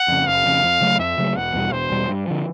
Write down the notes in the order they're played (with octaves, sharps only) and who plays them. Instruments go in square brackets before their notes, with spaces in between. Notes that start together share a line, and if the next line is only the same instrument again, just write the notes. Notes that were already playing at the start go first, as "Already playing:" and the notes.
Already playing: [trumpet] F#5
[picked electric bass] F2 C#3
[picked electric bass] F#1 [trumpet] F5
[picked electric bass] F2 C#3
F2
C#3 F#3 A3
[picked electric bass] F2 [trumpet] E5
[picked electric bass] C#3 F#3 A3
[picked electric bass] E1 [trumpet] F#5
[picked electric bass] E2 B2 G3
[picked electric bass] E1 [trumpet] C5
[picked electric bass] E2 B2 G3
G2
D3 F3